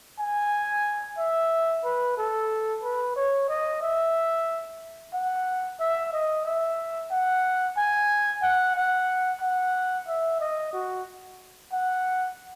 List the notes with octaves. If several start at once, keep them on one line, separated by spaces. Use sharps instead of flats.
G#5
E5
B4
A4
B4
C#5
D#5
E5
F#5
E5
D#5
E5
F#5
G#5
F#5
F#5
F#5
E5
D#5
F#4
F#5